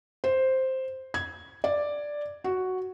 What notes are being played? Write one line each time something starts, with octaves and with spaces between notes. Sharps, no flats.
C5
G#6
D5
F#4